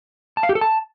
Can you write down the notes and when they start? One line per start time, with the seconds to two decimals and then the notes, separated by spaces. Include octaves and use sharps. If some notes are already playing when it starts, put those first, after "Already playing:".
0.37 A5
0.43 F5
0.49 G4
0.55 A4
0.61 A5